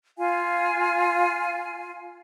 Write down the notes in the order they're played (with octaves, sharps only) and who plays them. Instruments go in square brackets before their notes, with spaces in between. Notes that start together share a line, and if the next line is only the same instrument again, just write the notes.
[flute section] F4 F5 G#5